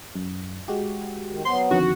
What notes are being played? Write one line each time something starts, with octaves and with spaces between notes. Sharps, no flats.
F#2
G#3 F#4 G4
D#3
F#3 B3 C5 C6
F2 D3 D#3 F#4